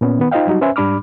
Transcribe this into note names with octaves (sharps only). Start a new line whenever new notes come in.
A#2 B3 C#4
D#3 B3
D#4 F4 C5 D#5 F5 G5
F#3 G3 D#4 F#4
C#4 B4 C5 E5 G#5
G#2 G3 D4 B5 D6 F6